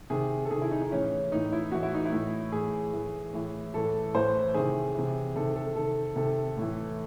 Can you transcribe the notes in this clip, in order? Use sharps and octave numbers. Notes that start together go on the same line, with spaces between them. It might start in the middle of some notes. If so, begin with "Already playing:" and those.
C3 D#3 G#4
A4
C3 D#3 G#4
E4
D#4
D#4
A2 E3 C#4
A2 E3 D#4
E4
A2 E3 F#4
E4
D#4
E4
A2 E3
A2 E3 G#4
A2 E3
A2 E3
A2 E3 A4
A2 E3 C5
C3 D#3 G#4
C3 E3
C3 D#3 A4
A4
C3 D#3 A4
C3 D#3 A4
A2
E3